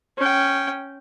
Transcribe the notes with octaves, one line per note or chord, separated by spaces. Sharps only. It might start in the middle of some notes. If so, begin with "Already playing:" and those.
C#4 G5